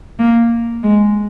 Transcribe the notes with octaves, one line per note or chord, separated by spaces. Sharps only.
A#3
G#3